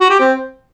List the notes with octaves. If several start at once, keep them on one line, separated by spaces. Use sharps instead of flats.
F#4
G4
C4